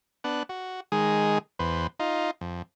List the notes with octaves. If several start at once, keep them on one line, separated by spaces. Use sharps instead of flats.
B3 D4 F#5
F#4
D#3 G#3 G#4
E2 B4 C5
D#4 F4
F2